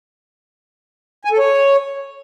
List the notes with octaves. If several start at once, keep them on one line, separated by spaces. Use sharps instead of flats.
G#5
A4
C#5